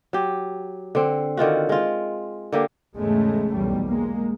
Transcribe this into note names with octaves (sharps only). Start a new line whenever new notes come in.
F#3 G4
D3 C4
D3 D#3 F4 F#4
G#3 F4
D3 A#3 G4
E2 G#2 C#3 G#3 A3
B1 E2 G3
G#3 A#3